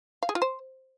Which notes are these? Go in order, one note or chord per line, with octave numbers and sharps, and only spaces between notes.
F5
G#4
F4
C5